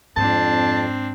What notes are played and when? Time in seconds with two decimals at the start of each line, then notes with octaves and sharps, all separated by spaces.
0.17 F2 G#2 C4 D4 A5